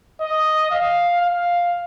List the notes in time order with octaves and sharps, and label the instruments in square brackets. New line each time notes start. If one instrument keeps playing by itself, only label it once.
[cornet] D#5
F5
F5